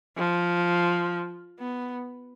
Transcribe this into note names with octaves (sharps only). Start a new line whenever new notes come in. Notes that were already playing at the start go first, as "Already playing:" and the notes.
F3
B3